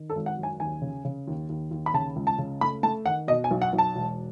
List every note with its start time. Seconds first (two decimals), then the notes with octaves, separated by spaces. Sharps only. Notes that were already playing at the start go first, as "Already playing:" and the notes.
Already playing: D#3
0.10 A4
0.15 G#1
0.26 F#5
0.38 F#2
0.43 G#5
0.60 D#2 G#5
0.82 C#3
1.05 C#3
1.27 D#2
1.49 D#2
1.71 D#2
1.86 B5
1.94 C#3 A5
2.16 C#2
2.27 A5
2.38 C#3
2.61 A3 B5
2.83 A3 A5
3.06 D#3 F#5
3.28 B2 D#5
3.44 G#5
3.51 B1
3.62 F#5
3.73 B1
3.78 A5
3.95 E1